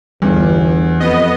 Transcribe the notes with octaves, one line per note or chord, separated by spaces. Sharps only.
G1 E2 G3
F2 B3 D#5